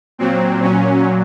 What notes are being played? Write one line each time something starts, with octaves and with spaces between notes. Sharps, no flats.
A#2 F#3 C4
C#4